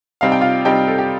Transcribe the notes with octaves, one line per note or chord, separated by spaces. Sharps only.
C3 G3 C4 D#4 F5
G5
F4 F5
C3 G3 C4 D#4 G4 G5
A4
G4